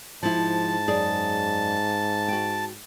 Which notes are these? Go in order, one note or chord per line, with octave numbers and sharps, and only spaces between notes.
G#2 F3 E4 A5
F#2 G#4 D5
F#4 G5